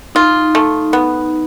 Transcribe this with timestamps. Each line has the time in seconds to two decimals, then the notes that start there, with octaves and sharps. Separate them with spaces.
0.15 D#4 F4
0.55 A3
0.93 B3